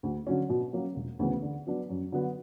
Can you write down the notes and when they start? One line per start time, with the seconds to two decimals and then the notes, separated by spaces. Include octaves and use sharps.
0.03 D2
0.27 D3 F#3 C#4
0.49 B2
0.73 F#3 A#3 C#4 F#4
0.96 E1
1.19 D2 C#3 E3 B3
1.42 D3
1.67 F#3 B3 D4
1.90 F#2
2.12 D3 F#3 B3